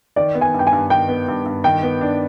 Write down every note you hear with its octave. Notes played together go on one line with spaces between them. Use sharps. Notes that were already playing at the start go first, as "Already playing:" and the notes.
D#3 D5
B3
G#5
G2
G5
G#5
G2
D#3 G5
B3
G2
G2
D#3 G5
B3
D4